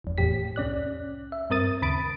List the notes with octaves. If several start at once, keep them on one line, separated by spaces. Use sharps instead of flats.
G1 F2
E2 A2 G4 B6
C2 C#4 D5 F#6
E5
G2 C4 A#4 D#6 A6 D#7
D#2 C#3 B5 A6 D7